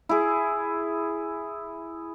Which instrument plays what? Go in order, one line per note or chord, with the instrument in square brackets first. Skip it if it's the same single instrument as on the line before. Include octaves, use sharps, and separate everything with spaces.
[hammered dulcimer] E4 G#4